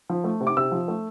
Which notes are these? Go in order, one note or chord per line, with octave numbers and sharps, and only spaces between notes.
F3
A3
C3
D6
C3 E6
F3
A3